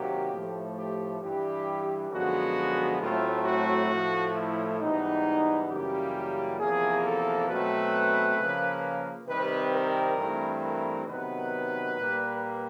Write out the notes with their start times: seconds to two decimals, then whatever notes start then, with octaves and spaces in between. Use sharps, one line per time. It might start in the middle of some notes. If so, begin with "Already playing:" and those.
Already playing: C3 D#3 F#3 A#3 G4
0.31 A2 F3 A3
0.76 G4
1.21 G2 E3 G3 G4
2.11 F#2 D3 F3 G#3 B3 F#4
3.00 A2 F#3 A3 C4 F4
3.45 F#4
3.90 A2 F3 A3
4.34 E4
4.79 G#2 E3 G3 B3 D#4
5.69 F#2 C#3 E3 G3 A#3 G4
6.59 E2 C3 F3 A#3 G#4
7.04 A4
7.48 B2 F#3 A3 C4 B4
8.37 C#3 F3 A#3
9.27 C3 D#3 G3 C4 B4
9.72 A#4
10.16 G2 E3 A3 C4
10.62 A#4
11.06 C3 D#3 F#3 B3 B4
11.96 A#2 G3 A#3